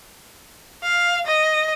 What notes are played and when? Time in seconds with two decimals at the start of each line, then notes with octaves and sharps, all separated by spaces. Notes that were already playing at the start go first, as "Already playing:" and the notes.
0.83 F5
1.26 D#5